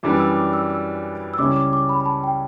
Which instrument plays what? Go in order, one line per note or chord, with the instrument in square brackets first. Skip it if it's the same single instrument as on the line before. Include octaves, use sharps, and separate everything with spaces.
[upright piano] F#2 E3 G3 D4 [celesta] D6
[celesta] E6
D6
E6
E6
E6
[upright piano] C#2 C#3 G3 C#4 E4 [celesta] D6
[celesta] D6
D6
B5
B5
A5
G5